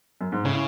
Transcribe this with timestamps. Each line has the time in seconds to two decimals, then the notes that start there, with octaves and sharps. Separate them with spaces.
0.21 F#2
0.32 G#2
0.45 A2 C#3